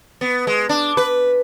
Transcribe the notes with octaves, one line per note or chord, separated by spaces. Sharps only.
B3
G#3
D4
B4